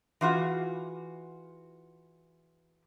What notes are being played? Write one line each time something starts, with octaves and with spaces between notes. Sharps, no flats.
E3 F4 F#4 G#4